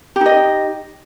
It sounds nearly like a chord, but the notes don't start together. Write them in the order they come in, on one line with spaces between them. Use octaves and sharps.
G4 D#4 D#5